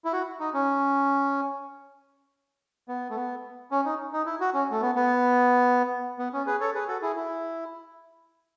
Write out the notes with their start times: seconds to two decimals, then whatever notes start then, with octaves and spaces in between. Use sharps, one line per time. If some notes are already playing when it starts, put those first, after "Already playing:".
0.05 E4
0.13 F#4
0.40 D#4
0.54 C#4
2.88 B3
3.10 A3
3.16 B3
3.71 C#4
3.85 D#4
4.13 D#4
4.26 E4
4.40 F#4
4.54 C#4
4.71 A3
4.82 B3
4.96 B3
6.19 B3
6.33 C#4
6.47 G#4 B4
6.61 A4 C#5
6.75 G#4 B4
6.88 F#4 A4
7.02 E4 G#4
7.16 E4